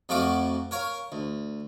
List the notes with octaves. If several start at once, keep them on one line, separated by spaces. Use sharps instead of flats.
F2 F3 A3 F#4 F5 D6
A#4 C#5 F5
D2